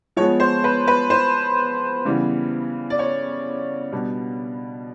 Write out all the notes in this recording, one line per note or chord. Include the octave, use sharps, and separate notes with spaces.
F3 G#3 B3 C#5
C5
B4
B4
C5
C#3 E3 G3 B3
D5
C#5
B2 G3 B3 D4